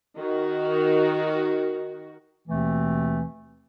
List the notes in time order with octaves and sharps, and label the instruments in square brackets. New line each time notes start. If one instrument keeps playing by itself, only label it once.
[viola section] D#3 F#4
[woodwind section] D#2 B2 E3 A3 C4